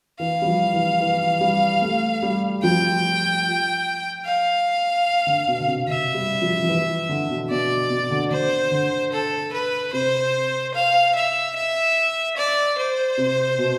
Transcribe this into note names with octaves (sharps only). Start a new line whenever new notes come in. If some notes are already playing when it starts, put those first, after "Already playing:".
E3 F5
G3
F3
E3
E3
G3
A3
G3
F3 G5
F5
D3
B2
D3
C3
D3 E5
G3
F3
F3
E3
D3
B2
B2 D5
B2
D3
D3 C5
D3
A4
B4
C3 C5
F5
E5
E5
D5
C5
C3
B2